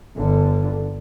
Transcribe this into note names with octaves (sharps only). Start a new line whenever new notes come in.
G1 D3